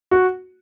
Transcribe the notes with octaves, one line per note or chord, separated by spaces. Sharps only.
F#4